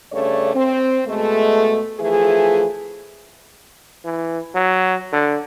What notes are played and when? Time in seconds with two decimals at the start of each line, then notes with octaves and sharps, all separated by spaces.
0.12 G2 C#3 A3 C#5 D5
0.54 C4
1.07 B2 G#3 A3
2.00 E3 F3 A3 G#4
4.05 E3
4.55 F#3
5.13 D3